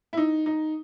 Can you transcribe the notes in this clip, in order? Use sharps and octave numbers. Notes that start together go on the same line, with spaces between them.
E4
D#4
D#4